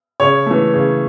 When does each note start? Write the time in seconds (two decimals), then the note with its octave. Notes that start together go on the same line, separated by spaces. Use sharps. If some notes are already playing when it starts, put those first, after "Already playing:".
0.20 C#3 C#5
0.46 E3 A3
0.73 C#3